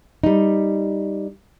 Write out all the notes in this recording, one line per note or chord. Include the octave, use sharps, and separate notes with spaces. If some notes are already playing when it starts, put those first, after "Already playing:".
G3 D#4